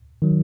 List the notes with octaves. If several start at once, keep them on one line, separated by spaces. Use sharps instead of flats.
D#3 F#3